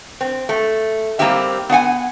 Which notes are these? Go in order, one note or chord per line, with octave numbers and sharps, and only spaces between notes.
C4
A3
G3 A#3 C4 D#4 G4 E5
B3 D4 F#5 G#5